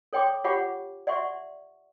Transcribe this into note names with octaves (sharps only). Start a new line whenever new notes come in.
A4 C#5 G5 C6 D6
F4 G4 C#5 F#5 B5 D6
D5 E5 F#5 C6 C#6